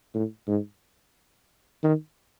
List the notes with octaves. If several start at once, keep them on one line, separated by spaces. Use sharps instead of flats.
A2
G#2
D#3